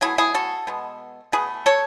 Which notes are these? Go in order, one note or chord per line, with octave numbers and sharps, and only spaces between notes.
B2 F#3 A3 E4 G#4
E4 G#4
F#4 A4
B2 G#3 B3
B2 A3 G#4 B4
A4 C#5